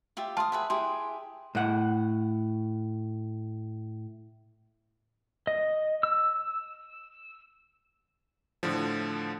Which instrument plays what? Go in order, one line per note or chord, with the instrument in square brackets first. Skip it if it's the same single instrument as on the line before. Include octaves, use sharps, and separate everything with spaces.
[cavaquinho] F4 G4 E5
[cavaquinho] F5 D#6 [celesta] A5 C6
[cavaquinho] G#4 B4 E5
[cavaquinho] E4 G4 G#4 [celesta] C6
[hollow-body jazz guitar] A2 F#5
[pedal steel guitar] D#5
E6
[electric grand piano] A2 D3 F3